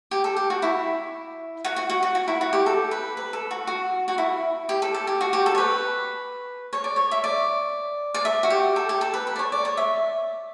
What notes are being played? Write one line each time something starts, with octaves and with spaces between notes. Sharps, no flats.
G4
A4
G4
F#4
E4
F#4
F#4
F#4
F#4
F#4
E4
F#4
G4
A4
B4
B4
A4
F#4
F#4
F#4
E4
G4
A4
A4
G4
F#4
G4
A4
C#5
B4
C#5
D5
C#5
E5
D5
D5
E5
F#4
G4
A4
G4
A4
B4
B4
D5
C#5
D5
C#5
E5